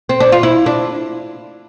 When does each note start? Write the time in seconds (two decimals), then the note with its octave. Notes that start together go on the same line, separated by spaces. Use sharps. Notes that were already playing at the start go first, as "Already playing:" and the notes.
0.09 C4
0.20 D4
0.32 F4
0.43 E4
0.66 D4